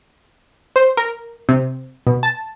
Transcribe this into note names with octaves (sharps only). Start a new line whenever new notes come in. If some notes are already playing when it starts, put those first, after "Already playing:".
C5
A#4
C3
B2
A5